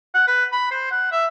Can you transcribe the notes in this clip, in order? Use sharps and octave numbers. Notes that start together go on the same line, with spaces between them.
F#5
B4
B5
C5
F#5
E5